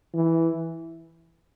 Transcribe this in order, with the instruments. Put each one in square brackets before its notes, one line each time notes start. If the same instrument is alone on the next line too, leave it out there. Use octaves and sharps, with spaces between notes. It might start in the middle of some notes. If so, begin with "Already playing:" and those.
[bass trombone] E3